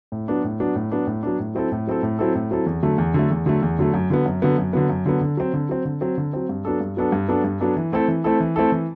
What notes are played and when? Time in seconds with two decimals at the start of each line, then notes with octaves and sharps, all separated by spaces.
0.12 A2
0.28 F#3 B3 D4
0.44 A2
0.60 F#3 B3 D4
0.75 A2
0.92 F#3 B3 D4
1.07 A2
1.23 F#3 B3 D4
1.40 A2
1.55 F#3 C4 E4 A4
1.72 A2
1.87 F#3 C4 E4 A4
2.03 A2
2.19 F#3 C4 E4 A4
2.35 A2
2.51 F#3 C4 E4 A4
2.66 E2
2.83 D3 F#3 A3
2.98 E2
3.14 D3 F#3 A3
3.30 E2
3.46 D3 F#3 A3
3.62 E2
3.79 D3 F#3 A3
3.94 F#2
4.10 D3 F#3 B3
4.26 F#2
4.42 D3 F#3 B3
4.58 F#2
4.73 D3 F#3 B3
4.90 F#2
5.06 D3 F#3 B3
5.21 D3
5.37 F#3 C4
5.54 D3
5.69 F#3 C4
5.85 D3
6.01 F#3 C4
6.18 D3
6.33 F#3 C4
6.49 G2
6.65 F#3 B3 D4 A4
6.81 G2
6.97 F#3 B3 D4 A4
7.12 G2
7.28 F#3 B3 D4 A4
7.44 G2
7.60 F#3 B3 D4 A4
7.77 E3
7.92 A3 C4 E4 A4
8.08 E3
8.24 A3 C4 E4 A4
8.40 E3
8.56 A3 C4 E4 A4
8.72 E3